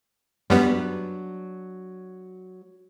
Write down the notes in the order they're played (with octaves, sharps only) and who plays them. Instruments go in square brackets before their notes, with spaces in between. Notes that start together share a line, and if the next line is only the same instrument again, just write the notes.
[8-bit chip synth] F#2 G3 B3 [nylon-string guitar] F#3 D4